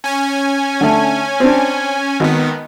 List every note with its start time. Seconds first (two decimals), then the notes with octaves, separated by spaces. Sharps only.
0.04 C#4 G#5
0.81 D3 A3
1.40 C4 D4
2.20 G#1 D#3 B3